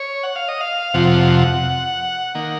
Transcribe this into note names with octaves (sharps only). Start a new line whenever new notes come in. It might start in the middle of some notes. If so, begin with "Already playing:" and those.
Already playing: C#5
F#5
F5
D#5
F5
F2 C3 F3 F#5
D#3 A#3